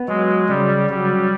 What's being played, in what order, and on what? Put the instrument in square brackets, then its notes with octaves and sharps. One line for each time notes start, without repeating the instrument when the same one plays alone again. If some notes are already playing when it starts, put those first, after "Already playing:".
Already playing: [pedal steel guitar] B3
[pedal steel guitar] F#3 [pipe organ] G#3
[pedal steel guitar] C#3 [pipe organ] G3
[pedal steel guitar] F#3 [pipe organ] G3